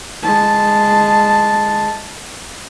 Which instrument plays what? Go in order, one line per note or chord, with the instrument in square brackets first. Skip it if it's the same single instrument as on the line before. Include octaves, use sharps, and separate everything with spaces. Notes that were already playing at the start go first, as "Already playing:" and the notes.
[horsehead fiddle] G#3 A5